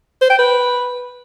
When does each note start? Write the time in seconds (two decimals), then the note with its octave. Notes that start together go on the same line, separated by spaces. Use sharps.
0.21 C5
0.30 G5
0.39 B4